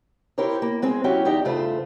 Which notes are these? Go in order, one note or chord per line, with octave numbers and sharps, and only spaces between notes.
E4 G4 A#4 C5 C#5
A#3
G#3 C4 G#4
F#3 C#4 E4 G4
E2 D#4 G4 D5
E2 G2 C#3 A3 F4 C5